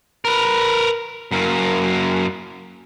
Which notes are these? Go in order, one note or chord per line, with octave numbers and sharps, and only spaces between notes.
A#4 B4
F#2 A#3